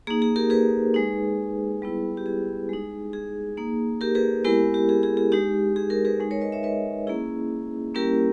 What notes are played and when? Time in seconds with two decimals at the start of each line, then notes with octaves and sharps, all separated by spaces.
0.07 A#3 D#4 G#4
0.22 G#4
0.36 G4 A#4
0.50 G#4 B4
0.94 G#3 D#4
1.82 G3 B3 E4
2.17 G4
2.26 G#4
2.69 G#3 D#4
3.13 G#4
3.57 A#3 D#4
4.01 G4 A#4
4.15 G#4 B4
4.44 G#3 B3 E4 G4 A#4
4.74 G4
4.89 G#4
5.03 G#4
5.17 G#4
5.32 G#3 D#4 G4
5.76 G#4
5.90 G4 A#4
6.05 G#4 B4
6.20 G#3 D#4
6.31 A#4 C#5
6.41 B4 D#5
6.52 C#5 E5
6.63 B4 D#5
7.07 A#3 C#4 E4 G#4
7.95 G3 A#3 C#4 E4 G4 A#4